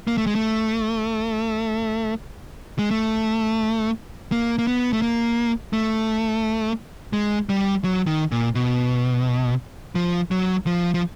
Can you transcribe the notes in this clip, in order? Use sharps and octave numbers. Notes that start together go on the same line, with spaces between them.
A#3
A3
G#3
A3
G#3
A3
A#3
A#3
B3
A3
A#3
A3
G#3
G3
F#3
D#3
A#2
B2
F3
F#3
F3
F3